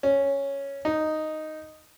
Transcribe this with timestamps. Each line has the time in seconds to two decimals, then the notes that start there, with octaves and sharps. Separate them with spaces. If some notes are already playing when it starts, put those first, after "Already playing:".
0.03 C#4
0.85 D#4